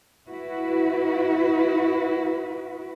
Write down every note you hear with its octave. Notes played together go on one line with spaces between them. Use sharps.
E4 F#4 B4